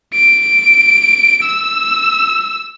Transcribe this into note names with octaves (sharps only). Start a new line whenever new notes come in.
D7
E6